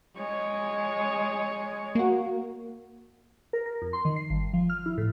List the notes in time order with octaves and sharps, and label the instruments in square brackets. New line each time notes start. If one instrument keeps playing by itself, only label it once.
[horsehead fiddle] G#3 C#5
[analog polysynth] A#3 F#4
[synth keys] A#4
A#4
F2
C6
D#3
C7
G1
F3
F6
E4
A2